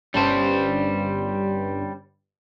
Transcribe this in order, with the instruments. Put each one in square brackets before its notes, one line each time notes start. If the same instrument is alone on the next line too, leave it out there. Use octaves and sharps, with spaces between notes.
[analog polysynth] G1 G2 [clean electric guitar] G3 C5 [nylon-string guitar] C#4 A5